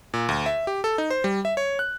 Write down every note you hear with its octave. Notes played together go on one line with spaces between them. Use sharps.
A#2
D2
E5
G4
A4
D#4
C5
G3
E5
C#5
F#6